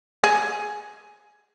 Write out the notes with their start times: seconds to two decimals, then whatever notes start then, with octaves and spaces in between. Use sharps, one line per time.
0.24 G#4